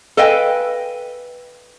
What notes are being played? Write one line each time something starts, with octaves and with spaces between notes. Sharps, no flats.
A4 B4 D#5 F5 G5 G#5